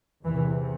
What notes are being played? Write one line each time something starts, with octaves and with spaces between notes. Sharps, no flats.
E2 C3 E3